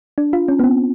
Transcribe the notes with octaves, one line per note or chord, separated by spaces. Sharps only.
D4
F4
C#4
B3
C4